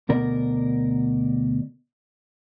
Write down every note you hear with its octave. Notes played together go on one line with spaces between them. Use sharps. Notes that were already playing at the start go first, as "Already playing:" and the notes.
D2 B2 A#4 D5